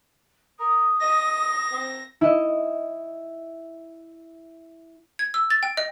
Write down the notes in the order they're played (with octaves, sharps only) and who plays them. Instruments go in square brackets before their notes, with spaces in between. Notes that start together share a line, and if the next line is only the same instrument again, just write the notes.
[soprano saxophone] A#4 [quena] D#6
[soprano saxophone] D#5 [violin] A#6
[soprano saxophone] C4
[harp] E4 D#5
[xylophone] G#6
E6
A6
G5
D#5